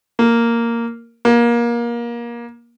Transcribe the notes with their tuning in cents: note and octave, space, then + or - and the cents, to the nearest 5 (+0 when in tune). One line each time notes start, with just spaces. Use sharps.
A#3 -5
A#3 +25